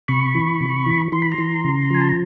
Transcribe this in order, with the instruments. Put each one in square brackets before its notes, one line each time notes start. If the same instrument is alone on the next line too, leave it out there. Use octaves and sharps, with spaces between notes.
[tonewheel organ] C3 B5 C#6
E3
C3
E3
E3 C6
B5
A#5 C6
E3
C#3
F3 G#5
A5
A#5